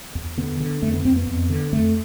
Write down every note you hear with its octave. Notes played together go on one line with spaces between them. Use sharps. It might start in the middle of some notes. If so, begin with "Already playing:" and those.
E2
D3 B3
D3
F2 A3
B3
F2 C4
B3
F2
D3
F2 A3